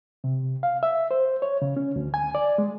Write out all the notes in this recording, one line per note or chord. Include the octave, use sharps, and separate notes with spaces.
C3
F5
E5
C5
C#5
C#3
C#4
D2
G#5
D5
G#3